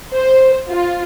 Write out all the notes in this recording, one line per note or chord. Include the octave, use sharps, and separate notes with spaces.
C5
F4